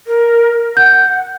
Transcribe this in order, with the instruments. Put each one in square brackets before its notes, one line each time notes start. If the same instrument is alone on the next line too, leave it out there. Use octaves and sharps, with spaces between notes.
[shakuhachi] A#4
[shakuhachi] F#5 [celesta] G6